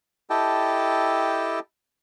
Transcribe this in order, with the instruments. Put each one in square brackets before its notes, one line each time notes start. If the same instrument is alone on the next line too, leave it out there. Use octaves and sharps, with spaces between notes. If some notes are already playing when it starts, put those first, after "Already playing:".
[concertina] E4 G4 A4 D#5 G5 A5